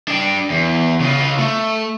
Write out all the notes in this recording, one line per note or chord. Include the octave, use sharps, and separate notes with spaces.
D4 G5
E2
C#3 F4
A3